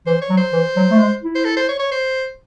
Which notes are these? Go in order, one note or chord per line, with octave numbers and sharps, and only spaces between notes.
E3 C5
C#5
F#3
C5
E3
F#3
A3
G#3
E4
C5
A4
C5
C#5
C#5
C5